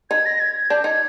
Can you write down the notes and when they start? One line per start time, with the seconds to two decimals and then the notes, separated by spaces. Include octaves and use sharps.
0.10 D#4 G#6
0.26 A#6
0.40 G#6
0.55 G#6
0.70 D4 G6
0.84 D#4 G#6